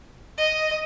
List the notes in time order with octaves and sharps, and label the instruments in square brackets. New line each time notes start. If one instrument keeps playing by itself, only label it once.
[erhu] D#5